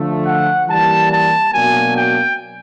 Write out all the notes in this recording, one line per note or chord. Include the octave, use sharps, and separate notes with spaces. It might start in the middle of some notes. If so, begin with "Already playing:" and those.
Already playing: D3 F3 A3
F#5
E3 G3 A#3 A5
A5
B2 F#3 A#3 D4 G#5
G5